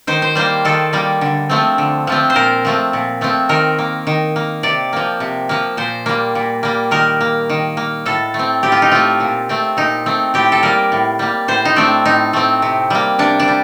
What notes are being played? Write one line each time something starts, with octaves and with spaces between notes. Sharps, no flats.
D#3 C5
C5
G3 A#3 C5
D#3 A4
G3 A#3
D3
F3 A3 C4
D3
F3 A3 C4
C5
A#2 A#4
F3 A3 C4
A#2
F3 A3 C4
D#3 A#4
A#3
D#3
A#3
C3 D5
F3 A#3
C3
F3 A#3
A#2 C5
G3 A#3
A#2
G3 A#3
D#3 A#4
A#3
D#3
A#3
A2 A4
A3
C4
A2 G4
F4
D#4
A3 C4 F4
A#2
A3 C4
A#2 D#4
A3 C4
A2 G4
A4
G3 A#3 A#4
A2
G3 A#3
A2 C5
D#4
A3 C4 D4
A2 D#4
A3 C4
C3
G3 A#3
C3 D4
D4
G3